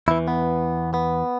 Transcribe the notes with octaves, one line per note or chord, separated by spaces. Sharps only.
E2 E3 E4
B3
B3